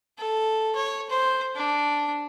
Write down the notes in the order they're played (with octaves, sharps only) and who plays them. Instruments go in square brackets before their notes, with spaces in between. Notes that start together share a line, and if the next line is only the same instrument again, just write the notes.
[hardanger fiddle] A4
C#5
C5
D4